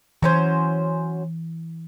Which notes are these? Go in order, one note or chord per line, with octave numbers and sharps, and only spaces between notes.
E3 F#3 C#4 C5